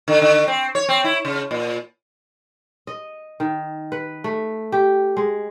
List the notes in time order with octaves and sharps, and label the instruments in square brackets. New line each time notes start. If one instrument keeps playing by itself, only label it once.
[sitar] D3
D3
C4
C#5
C4
E4
C#3
A#2
[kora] D#5
D#3
B4
A3
G4
G#3